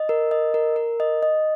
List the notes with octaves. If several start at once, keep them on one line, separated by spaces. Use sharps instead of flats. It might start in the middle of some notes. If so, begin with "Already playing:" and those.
Already playing: D#5
A#4
D#5
A#4
A#4
D#5
D#5